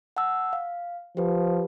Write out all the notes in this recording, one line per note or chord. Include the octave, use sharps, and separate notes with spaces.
F#5 A5 E6
F5
F3 G4 B4